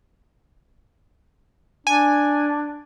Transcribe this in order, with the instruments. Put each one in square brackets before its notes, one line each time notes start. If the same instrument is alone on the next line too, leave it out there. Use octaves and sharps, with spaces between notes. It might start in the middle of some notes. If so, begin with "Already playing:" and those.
[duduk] D4 [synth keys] G#5